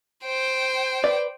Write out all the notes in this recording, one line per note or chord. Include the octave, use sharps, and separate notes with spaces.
C5 G5
B4 D5